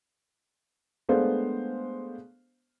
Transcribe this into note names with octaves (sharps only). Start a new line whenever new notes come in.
G#3 A3 B3 D4 C5 F5